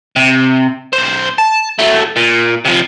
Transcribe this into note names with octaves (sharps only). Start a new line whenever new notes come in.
C3
B1 C5
A5
F#3 A3
A#2
C3 F3